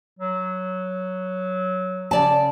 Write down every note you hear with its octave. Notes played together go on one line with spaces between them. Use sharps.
F#3
C#3 D5 A5